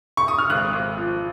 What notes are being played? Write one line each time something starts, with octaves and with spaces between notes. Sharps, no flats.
C#6
D#6
F6
G#1 F#6
G#1
F3